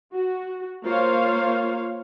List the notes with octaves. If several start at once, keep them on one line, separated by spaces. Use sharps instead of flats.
F#4
A#3 F4 C5 C#5 F5